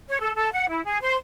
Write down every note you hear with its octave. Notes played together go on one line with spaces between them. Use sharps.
C#5
A4
A4
F#5
E4
G#4
C5